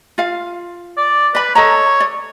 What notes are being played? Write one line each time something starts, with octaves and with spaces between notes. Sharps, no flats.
F4 F5
D5
B4 D5 B5
A4 C#5 D#5 A#5
D5